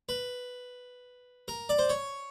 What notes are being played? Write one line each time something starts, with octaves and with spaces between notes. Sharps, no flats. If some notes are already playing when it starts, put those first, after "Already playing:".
B4
A#4
D5
C5
C#5